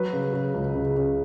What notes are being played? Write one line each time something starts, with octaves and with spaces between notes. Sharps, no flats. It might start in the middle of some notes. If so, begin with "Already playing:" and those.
Already playing: F#3 B4
C#3
C#3
C#2
C#3
C#3